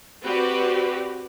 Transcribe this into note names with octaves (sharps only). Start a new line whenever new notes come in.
C4 F#4 G4 B4 D5